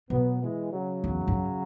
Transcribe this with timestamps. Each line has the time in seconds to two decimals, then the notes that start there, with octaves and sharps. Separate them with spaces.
0.10 B2 F#3 B3
0.42 E3 G#3
0.73 C#3 F#3
1.04 E2
1.28 F#2